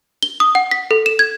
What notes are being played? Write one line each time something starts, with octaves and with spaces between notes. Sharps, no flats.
G7
D#6
F#5
B6
A4
E7
G#6